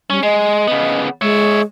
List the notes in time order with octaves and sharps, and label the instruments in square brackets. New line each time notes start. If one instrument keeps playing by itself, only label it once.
[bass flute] G3 [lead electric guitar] C#4
[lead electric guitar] G#3 [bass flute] D#5
[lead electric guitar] C#3 B3
[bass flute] G#3 [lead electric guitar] C#5 E5